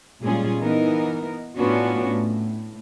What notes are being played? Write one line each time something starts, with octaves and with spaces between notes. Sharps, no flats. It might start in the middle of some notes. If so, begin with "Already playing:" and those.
A#2 G3 G#3 C#4 F4 G#4
E3 B3 D#4 A#4
A2 B3 C#4 D4 F4 F#4
A2